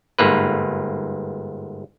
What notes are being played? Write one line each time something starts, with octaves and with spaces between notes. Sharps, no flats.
G1 G#2 A#3 B4